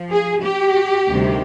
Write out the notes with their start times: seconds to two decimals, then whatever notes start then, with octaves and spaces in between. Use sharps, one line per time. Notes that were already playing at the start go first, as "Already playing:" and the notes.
Already playing: F3
0.12 G#4
0.44 G4
1.09 D2 C3 D#3 G3